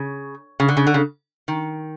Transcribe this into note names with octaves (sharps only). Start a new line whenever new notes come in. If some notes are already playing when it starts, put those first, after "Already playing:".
Already playing: C#3
C#3
D3
C#3
D3
C#3
D#3